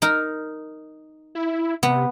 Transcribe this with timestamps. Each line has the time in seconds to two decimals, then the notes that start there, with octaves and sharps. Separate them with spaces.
0.02 D#4 A#4
1.35 E4
1.83 C3 B3